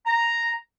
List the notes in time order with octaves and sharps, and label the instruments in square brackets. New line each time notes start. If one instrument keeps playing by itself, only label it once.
[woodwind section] A#5